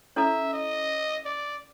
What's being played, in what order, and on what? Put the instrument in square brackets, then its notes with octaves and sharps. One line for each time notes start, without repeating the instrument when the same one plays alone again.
[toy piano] C#4 E4 A4 C#5 [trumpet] E5
[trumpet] D#5
D5